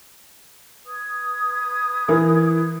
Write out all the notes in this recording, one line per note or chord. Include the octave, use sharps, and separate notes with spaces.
B4 D#6 G#6
E3 A#4